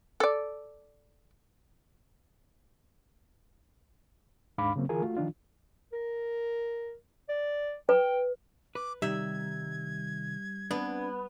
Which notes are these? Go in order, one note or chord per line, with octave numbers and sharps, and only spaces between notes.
A4 D5
D#2 G#2 D4 F5 B5 D6
C#3 F#3 A#3 C4
D3 E3 F4 G#4 A#4 G#5
A3 F4 F#4
D#3 F3 D4 F4
A#4
D5
B4 G5
B4 D6
C3 D#3 G3 D#4 E5 G#6
B3 C4 D4